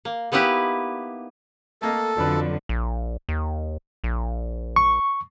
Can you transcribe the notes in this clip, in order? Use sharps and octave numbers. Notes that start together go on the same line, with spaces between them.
A#3
A#3 B3 D#4 E4 G4 B4
A3 A#3 A4 D#5
F2 D3 F3 F#3 D4 B4
A#1
D#2
A#1
C#6